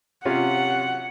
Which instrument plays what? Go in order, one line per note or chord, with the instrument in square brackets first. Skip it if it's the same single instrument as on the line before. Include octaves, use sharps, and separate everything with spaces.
[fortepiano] C3 C#4 F4 [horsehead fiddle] F#5